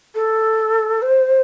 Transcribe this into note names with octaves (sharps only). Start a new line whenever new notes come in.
A4
C5